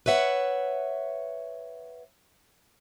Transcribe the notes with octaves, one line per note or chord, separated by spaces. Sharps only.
B4 C#5 E5 F#5